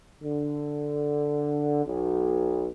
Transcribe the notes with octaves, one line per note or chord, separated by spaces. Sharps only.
D3
B1